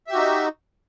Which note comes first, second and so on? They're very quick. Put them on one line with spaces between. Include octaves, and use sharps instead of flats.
E5 G4 F#4 D#4